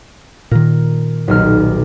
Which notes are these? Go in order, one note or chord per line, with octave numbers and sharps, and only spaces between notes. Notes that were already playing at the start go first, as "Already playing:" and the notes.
A#2 D#3 A#4
D#1 B1 F6